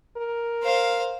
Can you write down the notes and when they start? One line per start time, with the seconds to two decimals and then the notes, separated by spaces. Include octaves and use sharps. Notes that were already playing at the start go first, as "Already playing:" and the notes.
0.17 A#4
0.63 C5 F5